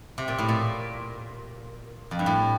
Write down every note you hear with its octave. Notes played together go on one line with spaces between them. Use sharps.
C3
A#2
A2
A#2
F2
G2
A2